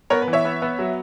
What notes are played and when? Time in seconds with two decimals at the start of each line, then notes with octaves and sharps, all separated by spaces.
0.10 B3 A#4 C#5
0.22 B4
0.27 E3
0.33 C#5 E5
0.45 B3
0.62 B3
0.79 F#3